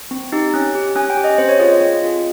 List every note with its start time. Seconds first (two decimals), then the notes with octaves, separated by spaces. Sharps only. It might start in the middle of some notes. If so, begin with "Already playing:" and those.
0.11 C4
0.32 D#4 G4
0.54 C#4
0.75 G4
0.96 C#4 G#5
1.10 G5
1.17 G4
1.24 D#5
1.38 C4 C5
1.49 C#5
1.59 F4 G#4 D#5
1.70 D#5
1.81 C4
2.02 F4 G#4